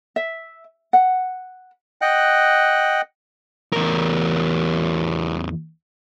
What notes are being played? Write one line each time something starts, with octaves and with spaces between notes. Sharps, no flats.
E5
F#5
D#5 F#5 G5 F#6
E2 A#4